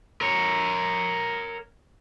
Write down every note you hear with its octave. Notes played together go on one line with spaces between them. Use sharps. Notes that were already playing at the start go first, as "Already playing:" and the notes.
A#4 C#5